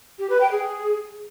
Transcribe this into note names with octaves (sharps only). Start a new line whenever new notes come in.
G4
B4
G5
G#4